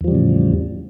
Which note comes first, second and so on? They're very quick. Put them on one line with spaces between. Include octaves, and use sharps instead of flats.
E2 F3 G3 C#3 A2